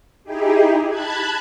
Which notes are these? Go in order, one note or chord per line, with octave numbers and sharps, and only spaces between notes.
D#4 E4 G4 G#4
A5 B5 F#6 G#6